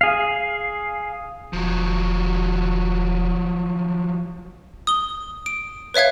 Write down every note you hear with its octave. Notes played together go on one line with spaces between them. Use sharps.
G#4 F5
E1 F3 F#3
D#6 G7
D7
B4 C#5 E5 F5 G#6